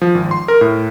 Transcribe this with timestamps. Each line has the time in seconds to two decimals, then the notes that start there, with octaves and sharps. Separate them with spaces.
0.02 F3
0.15 G#1
0.31 C6
0.48 A#4
0.61 A2